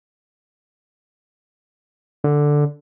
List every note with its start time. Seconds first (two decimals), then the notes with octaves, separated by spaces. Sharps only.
2.24 D3